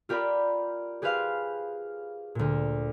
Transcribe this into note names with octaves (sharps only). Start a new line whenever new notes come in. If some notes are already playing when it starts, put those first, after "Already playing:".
F4 G4 A#4 D5 B5
G4 G#4 B4 C5 F5
D2 A#2